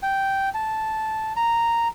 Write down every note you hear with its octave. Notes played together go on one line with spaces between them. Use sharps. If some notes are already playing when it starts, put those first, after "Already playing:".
G5
A5
A#5